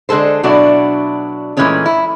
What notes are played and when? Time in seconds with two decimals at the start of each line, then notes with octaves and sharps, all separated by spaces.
0.09 D3 G#3 G#4 A4 C5
0.43 B2 F#3 D4 E4 F#4
1.57 A#2 E3 G#3 A3 C#4 G#4
1.86 E4